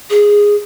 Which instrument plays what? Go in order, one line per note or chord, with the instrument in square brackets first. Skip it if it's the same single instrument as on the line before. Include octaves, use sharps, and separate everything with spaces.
[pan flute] G#4